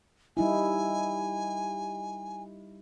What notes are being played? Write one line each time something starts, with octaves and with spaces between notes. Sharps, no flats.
G3 D#4 E4 G#5